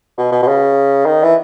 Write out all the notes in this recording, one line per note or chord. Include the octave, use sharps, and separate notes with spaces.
B2
B2
B2
C#3
D#3
E3